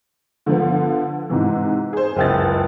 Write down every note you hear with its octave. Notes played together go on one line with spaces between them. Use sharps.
D3 F3 B3
G#2 C3 E3
G#4 C5
F#1 C#2 A6